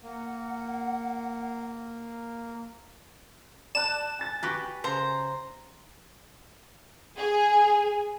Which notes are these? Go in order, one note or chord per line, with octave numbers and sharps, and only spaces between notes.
A#3 F#5
D5 A5 F#6 E7
G#5 A6
F#4 G4 B4
C#3 C5 A#5
G#4